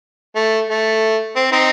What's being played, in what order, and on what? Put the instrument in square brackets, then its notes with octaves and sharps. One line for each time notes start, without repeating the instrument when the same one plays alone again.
[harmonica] A3
A3
C4
C4 D#4